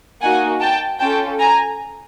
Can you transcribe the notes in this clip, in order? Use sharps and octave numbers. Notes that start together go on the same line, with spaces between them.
A#3 D#4 F#4 F#5 G#5
G5 A5
C#4 F4 A4 G5 A5
G#5 A#5